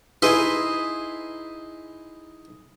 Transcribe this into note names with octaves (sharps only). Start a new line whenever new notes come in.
D#4 E4 G#4 B4 D#5 C6